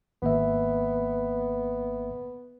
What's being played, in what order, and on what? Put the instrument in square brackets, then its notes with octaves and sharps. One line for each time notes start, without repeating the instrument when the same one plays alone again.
[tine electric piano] G#1 A#3 E5 [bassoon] B3